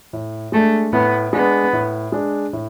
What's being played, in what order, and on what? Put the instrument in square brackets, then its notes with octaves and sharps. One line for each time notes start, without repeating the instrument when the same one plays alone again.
[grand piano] A2
[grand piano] G#3 D4 [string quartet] A3
[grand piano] A2 [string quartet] B3
[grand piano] G#3 D4 [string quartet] B3
[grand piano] A2
G#3 D4
A2